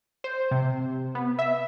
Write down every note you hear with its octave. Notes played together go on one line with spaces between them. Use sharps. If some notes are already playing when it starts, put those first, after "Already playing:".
C5
C3
B3
E5